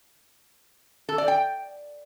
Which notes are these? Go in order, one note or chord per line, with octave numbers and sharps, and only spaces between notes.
A4
D5
G5